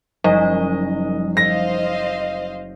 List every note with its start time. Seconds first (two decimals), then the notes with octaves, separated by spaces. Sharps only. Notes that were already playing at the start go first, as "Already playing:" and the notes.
0.24 F#1 F3 G3 D#4 D#5
1.37 C5 D#5 F5 A#6